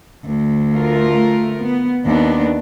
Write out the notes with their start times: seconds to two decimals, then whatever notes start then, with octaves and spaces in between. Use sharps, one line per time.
0.25 D2
0.73 A3 F4 A#4
1.62 B3
2.05 D#2 B3 D4